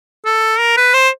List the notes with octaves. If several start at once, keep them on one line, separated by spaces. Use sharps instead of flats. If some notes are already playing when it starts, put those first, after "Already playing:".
A4
A#4
B4
C5